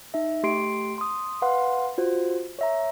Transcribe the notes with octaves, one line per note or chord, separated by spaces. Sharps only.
D#4 E5
A3 G4 C6 C7 D7
C6 D#6
B4 F5 F#5 C6
F4 F#4 C5
C#5 E5 A#5